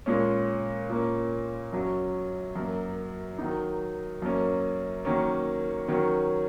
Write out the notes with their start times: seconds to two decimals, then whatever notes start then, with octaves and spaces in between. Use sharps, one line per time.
0.06 A#2 G#3 C#4
0.90 A#2 A#3 C#4
1.72 F#2 F#3 C#4
2.55 F#2 F#3 A#3
3.39 D#3 F#3 D#4
4.22 F#2 F#3 A#3 C#4
5.05 D#3 F#3 A#3 C#4
5.88 D#3 F#3 C#4